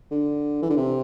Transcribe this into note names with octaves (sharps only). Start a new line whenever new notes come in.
D3
E3
D3
C3